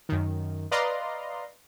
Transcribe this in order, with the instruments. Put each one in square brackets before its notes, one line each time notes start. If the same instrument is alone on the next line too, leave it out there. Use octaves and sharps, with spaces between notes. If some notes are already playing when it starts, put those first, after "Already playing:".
[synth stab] F#2 D#3
B4 D5 D#5 F5 A#5 C6